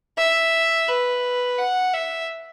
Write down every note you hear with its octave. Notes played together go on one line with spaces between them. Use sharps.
E5
B4
F#5
E5